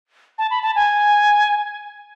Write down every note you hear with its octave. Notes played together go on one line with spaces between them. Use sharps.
A5
B5
A5
G#5